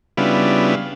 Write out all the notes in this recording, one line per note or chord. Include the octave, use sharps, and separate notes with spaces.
C#3 G3 B3 D4 E4 F4